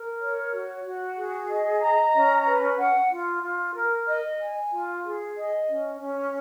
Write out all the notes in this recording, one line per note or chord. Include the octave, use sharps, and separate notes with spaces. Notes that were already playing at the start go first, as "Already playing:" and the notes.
Already playing: A#4
C#5
F#4
F#4
G#4
D#5
A#5
C#4
B4
F#5
F4
F4
A#4
D#5
G#5
F4
G#4
D#5
C#4
C#4